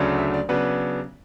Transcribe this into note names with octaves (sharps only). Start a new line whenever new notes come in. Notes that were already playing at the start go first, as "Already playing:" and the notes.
Already playing: D2 C#3 F#3 A3 D4
E5
D5
C#3 F#3 B3 D4 B4